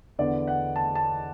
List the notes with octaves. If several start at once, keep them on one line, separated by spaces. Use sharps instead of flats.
E2 D3 B3 D5
F#5
A5
A5